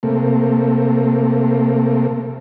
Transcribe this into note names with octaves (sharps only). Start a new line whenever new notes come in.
C3 A3 A#3